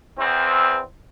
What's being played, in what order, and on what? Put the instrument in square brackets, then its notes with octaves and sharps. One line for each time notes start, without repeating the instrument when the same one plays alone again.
[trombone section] E2 C4